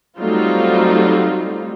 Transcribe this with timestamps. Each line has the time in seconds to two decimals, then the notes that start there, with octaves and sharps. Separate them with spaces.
0.19 F#3 G3 A3 C4 D#4 F4